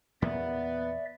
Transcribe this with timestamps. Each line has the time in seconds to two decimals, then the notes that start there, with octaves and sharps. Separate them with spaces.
0.22 E2 A#2 A#3 B3 D5 E5